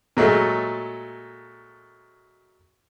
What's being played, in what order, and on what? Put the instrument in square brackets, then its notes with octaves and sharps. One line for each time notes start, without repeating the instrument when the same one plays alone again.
[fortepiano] A#2 F#3 G#3 A3